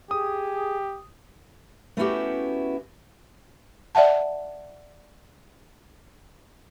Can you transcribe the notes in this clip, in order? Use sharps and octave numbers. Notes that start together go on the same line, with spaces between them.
G4 G#4 D#6
A3 B3 C#4 E4 F#4 G4
D5 E5 F#5 A5